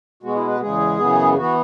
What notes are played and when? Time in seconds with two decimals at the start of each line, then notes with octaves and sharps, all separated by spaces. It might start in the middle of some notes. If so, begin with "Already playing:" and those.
0.23 B2 G#3 B3 F#4
0.35 E4
0.48 B4
0.60 E2 C#3 G#3 G#4
0.99 F#2 C#3 E3 B3
1.36 E3 B3 F#4